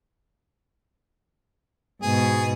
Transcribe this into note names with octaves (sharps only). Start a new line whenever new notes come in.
G#2 B2 G#4